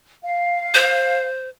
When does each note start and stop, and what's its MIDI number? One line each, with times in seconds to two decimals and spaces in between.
0.24 1.24 77
0.74 1.49 72